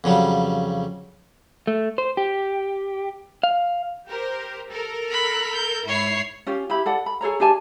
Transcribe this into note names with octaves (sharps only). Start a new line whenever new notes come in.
F2 C#3 F#3 G3
A3
C5
G4
F5
G4 A#4 C5
A4 A#4
B5 F#6
G6
G#2 E4 C#5 C7
C#4 F4 G4
E4 G4 B5
A4 D5 F#5
B5
G#4 A4 C#5 A#5
D4 G4 G#5 A5